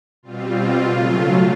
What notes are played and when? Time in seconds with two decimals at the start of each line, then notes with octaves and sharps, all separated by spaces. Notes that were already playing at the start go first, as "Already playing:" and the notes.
0.23 B2 G3 C4 F4
0.85 C#3 F#3 A3